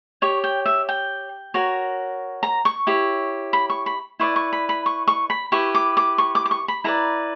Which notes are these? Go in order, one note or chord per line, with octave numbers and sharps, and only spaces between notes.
G4 C#5 C#6
G5
E5
G5
F#4 A#4 C#5
A#5
C#6
E4 G4 C#5
B5
C#6
B5
E4 B4 D5 C#6
C#6
B5
B5
C#6
C#6
B5
E4 G4 B4 C#6
D6
D6
C#6
D6
D6
C#6
B5
E4 B4 D5 A#5